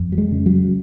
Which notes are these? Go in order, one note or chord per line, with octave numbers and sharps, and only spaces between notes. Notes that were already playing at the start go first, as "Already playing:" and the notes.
Already playing: F2
F#3
G#3
C#3
F#3